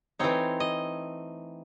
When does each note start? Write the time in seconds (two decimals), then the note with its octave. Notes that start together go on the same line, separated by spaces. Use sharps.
0.19 E3 A3 C4 D#4 C#5
0.60 D#5